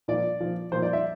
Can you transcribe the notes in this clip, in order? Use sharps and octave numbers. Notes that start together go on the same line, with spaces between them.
A#2 F3 D5
A#2 F3
A#2 F3 C5
D5
E5